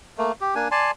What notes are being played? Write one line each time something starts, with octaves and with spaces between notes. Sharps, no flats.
A3 A#3
G4
A#3 D4 G#5
D5 G#5 A5 C6